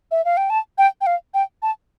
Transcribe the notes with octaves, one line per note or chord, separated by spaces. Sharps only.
E5
F5
G5
A5
G5
G5
F5
G5
A5